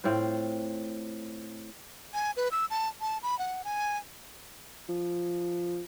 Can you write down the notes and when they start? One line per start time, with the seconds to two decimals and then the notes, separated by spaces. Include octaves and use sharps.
0.04 A2 C4 F4 C5
2.14 G#5
2.37 B4
2.51 E6
2.70 A5
3.01 A5
3.23 B5
3.39 F#5
3.65 G#5
4.89 F3